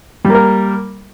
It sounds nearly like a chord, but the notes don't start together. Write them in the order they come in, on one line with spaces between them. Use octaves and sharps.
G3 A#3 A#4